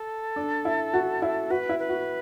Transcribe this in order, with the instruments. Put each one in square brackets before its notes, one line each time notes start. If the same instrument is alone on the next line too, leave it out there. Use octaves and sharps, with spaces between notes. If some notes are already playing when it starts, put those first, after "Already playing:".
Already playing: [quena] A4
[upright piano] D4
E4
F#4
E4
[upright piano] F#4 [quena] B4
[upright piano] E4
[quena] B4
[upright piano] F#4